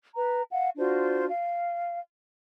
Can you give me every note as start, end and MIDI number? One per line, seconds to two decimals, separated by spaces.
0.15 0.42 71
0.15 0.42 82
0.50 0.68 77
0.50 0.68 78
0.76 1.27 62
0.76 1.27 65
0.76 1.27 66
0.76 1.27 72
1.29 1.99 77